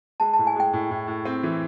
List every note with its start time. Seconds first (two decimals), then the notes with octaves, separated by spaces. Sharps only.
0.20 G#3 A5
0.33 A2 A5
0.47 G#5
0.56 G#3 G5
0.73 A2
0.90 A2
1.07 A2
1.25 C4
1.43 E3